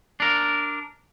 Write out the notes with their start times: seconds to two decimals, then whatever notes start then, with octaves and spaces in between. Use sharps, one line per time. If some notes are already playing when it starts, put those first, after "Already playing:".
0.20 D4 A#4